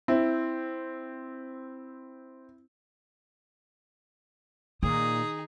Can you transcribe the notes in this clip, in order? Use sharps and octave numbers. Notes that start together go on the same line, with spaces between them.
C4 E4
A#2 D#3 D#4 G#4 D#6